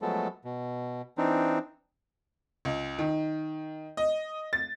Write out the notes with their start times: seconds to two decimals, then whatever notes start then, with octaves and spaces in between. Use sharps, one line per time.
0.02 F3 F#3 G#3 A3 B3 A4
0.45 B2
1.18 E3 C4 D4 D#4
2.65 C#2
2.99 D#3
3.97 D#5
4.53 A6